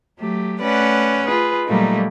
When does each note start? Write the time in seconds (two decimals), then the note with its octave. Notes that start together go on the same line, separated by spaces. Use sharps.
0.18 F#3 A3 G4
0.61 A3 C#4 B4 D5 F#5
1.25 F4 G#4 B4
1.67 A#2 F#3 G3 A3 A#3 D#4